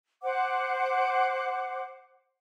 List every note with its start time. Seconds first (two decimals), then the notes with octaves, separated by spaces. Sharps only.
0.23 C5 F#5 D6